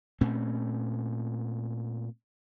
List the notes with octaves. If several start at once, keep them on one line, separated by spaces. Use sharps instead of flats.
A#2 A3 C4 C#4